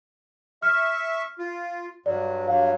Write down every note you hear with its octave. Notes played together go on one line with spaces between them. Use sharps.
E5 C#6 F6
F4
G2 F#3 D5
G2 F#3 F5